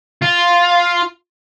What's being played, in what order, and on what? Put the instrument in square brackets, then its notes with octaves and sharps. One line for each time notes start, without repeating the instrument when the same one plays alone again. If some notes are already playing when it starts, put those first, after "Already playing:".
[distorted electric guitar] F4